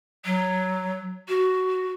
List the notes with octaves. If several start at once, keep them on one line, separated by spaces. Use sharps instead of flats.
F#3
F#4